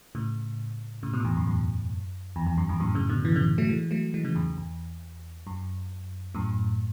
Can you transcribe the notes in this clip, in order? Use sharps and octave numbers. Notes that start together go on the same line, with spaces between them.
A2 C#3
A2 C#3
G#2 B2
A2
E2 G#2
F#2
F#2
E2
E2
F#2
E2 G#2
F#2 A2
A2 C#3
B2 D3
C#3 E3
C#3 E3
F#3 A3
E3 G#3
F#3 A3
E3 G#3
C#3 E3
E2 G#2
E2
E2
F#2
F#2 A2